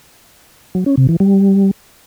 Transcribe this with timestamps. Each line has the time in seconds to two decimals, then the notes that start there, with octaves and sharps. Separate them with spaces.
0.75 F#3
0.86 C#4
0.97 C3
1.09 E3
1.20 G3